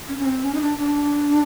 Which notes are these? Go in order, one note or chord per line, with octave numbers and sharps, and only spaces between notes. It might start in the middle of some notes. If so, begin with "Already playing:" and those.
C#4
C#4
C4
C#4
D#4
D4
D4